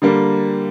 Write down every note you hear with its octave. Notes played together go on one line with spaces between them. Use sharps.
D3 G3 A#3